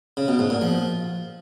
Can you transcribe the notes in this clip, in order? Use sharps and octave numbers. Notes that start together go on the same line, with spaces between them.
C#3
B2
G#2
A#2
F3